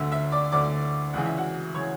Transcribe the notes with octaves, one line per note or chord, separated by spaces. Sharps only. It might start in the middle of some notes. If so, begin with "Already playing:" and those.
Already playing: D2 D3 E5 E6
E5 E6
D5 D6
D2 D3 D5 D6
C#2 C#3 E3 F#5
E5
F#4 F#5
C#3 E3 C#5 C#6